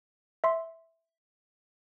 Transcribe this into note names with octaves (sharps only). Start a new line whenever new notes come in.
E5 C6